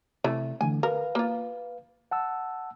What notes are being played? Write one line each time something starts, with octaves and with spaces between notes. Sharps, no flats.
C3 E3 A3
D3 E3 A3 G#5
A#4 B4 F5
A#3 F4
F#5 A5 E6